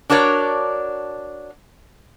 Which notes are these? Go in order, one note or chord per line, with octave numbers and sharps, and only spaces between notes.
D4 F#4 A#4 C#5 D5